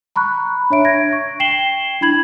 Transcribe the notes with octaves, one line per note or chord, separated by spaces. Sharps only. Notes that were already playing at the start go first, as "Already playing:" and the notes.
A#5 B5 C#6 F#6
D4 C#5 E5 D7
G#6 A#6 D7
C#6
G5 C7 E7 F#7 G7
D4 E4 B5 G#6 F#7